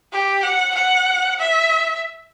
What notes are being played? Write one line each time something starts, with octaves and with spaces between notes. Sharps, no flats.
G4
F#5
F#5
E5